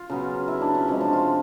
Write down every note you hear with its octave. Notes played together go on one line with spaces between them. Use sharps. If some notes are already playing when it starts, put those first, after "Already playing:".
Already playing: F4
C#3 F#3 B3
E4
D4
C#4
C3 F3 G#3 C#4
D4
F4